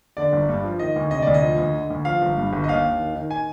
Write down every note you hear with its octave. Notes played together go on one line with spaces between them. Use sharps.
D3 D5
G1
G2
F3
D#3 D#5
D2
C3 D#5
D2 D5
D#5
F3
D2
D3
D2
F3 F5
G1
G2
G1
D#5
D#2 F5
D#2
D#3
D#3
G#5